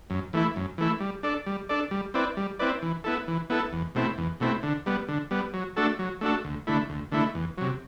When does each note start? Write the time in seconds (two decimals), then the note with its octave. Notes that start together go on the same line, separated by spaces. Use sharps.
0.10 F#2
0.33 E3 A3 E4
0.56 F#2
0.78 E3 A3 E4
1.00 G3
1.23 D4 A4 D5
1.47 G3
1.69 D4 A4 D5
1.91 G3
2.14 C4 E4 B4 D5
2.37 G3
2.59 C4 E4 B4 D5
2.82 E3
3.04 B3 E4 A4
3.28 E3
3.50 B3 E4 A4
3.73 E2
3.95 B2 A3 C4 E4
4.18 E2
4.40 B2 A3 C4 E4
4.63 D3
4.86 G3 B3
5.08 D3
5.31 G3 B3
5.54 F#3
5.76 A3 D4 F#4 A4
5.99 F#3
6.21 A3 D4 F#4 A4
6.45 D2
6.67 D3 A3 E4
6.89 D2
7.12 D3 A3 E4
7.35 E2
7.58 C3 F#3